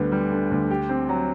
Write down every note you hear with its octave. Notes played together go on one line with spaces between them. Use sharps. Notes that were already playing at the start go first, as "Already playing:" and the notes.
Already playing: D2 D3 G3 B3
G3
D3
D2
G4
C4
F#3